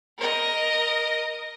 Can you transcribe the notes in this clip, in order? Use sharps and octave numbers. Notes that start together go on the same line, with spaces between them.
A#4 D#5